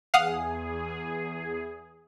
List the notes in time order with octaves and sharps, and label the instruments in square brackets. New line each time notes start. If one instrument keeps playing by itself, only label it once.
[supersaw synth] E2 G#4 [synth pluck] F5 F#5 D#6